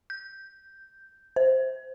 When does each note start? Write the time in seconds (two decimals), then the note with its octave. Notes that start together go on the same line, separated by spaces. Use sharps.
0.10 G6
1.36 C5